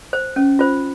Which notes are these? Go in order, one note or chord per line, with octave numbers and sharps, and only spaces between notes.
C5
C#4
F4 C5